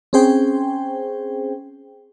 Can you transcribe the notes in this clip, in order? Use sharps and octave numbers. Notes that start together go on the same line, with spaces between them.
C4 C#4 G#4 C5 G5